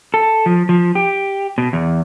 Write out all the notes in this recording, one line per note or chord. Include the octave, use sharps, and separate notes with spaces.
A4
F3
F3
G4
B2
E2